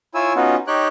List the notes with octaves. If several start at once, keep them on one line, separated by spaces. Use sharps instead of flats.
E4 F4 C#5 G#5 E6
B3 C#4 D#4 F4 F#4
D#4 G4 C#5 G5 F#6